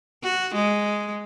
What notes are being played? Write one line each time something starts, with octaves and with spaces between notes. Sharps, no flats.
F#4
G#3